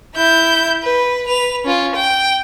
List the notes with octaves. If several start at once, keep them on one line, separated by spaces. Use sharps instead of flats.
E4 G6
B4
B4 F7
C#4 F4
G5